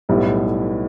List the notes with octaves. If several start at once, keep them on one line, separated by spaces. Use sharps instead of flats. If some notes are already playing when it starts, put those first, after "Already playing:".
B1 A2 G3 B3 E4